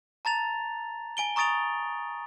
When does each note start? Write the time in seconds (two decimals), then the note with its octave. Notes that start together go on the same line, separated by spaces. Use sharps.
0.25 A5 A#5 A6 F7
1.17 G#5 D7 G7
1.36 A#5 C#6 D#6 A6 D7 F7